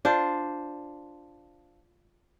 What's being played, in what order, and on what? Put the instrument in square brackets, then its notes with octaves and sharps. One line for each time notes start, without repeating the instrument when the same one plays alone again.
[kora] D4 F4 C5